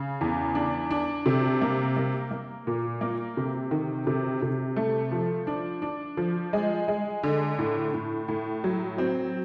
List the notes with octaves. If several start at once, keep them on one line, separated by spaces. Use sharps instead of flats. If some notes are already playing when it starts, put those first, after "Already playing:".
Already playing: C#3
E2
D4
D4
C3
A#3
A#3
A#3
A#2
A#3
C3
D#3
C3
C3
A3
F3
D4
D4
F3
G#3
G#3
D3
A2
A2
A2
F#3
C4